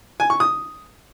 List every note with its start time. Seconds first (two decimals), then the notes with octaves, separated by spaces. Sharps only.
0.20 G#5
0.30 C#6
0.40 D#6